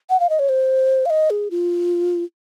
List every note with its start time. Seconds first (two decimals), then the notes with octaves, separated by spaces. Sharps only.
0.10 F#5
0.20 F5
0.29 D#5
0.39 C#5
0.49 C5
1.06 F5
1.10 D#5
1.30 G#4
1.51 F4